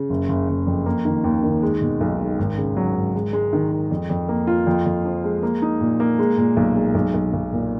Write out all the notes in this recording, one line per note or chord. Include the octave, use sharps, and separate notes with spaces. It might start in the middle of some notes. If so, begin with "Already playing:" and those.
Already playing: C#3
F#1
F#1
F#1
F2
A#3
D#3
D#2
D#3
G#3
B2
B1
G#3
G#1
C#3
F#3
G#1
G#3
G#3
D#3
G#3
F2
F2
A#3
F4
F2
F2
F3
G#3
A#3
D#4
A#2
A#3
G#3
A#2
B1
G#3
B1
B1
B1
A#2